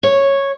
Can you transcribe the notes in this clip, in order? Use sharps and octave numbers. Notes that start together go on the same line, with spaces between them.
C#5